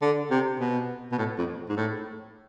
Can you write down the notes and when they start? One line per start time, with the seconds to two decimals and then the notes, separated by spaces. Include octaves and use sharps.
0.02 D3
0.31 C3
0.60 B2
1.12 B2
1.18 A2
1.38 F2
1.69 G#2
1.76 A2